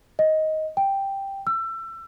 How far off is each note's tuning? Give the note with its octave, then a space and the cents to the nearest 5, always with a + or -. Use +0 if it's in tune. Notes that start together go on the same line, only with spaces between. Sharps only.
D#5 +10
G5 +5
E6 +25